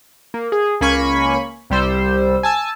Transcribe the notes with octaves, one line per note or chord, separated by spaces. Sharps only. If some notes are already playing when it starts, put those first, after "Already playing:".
A#3
G#4
C#2 A#3 C#4 G#5 B5 C#6
C2 G3 C5 E6
G#5 A5 E6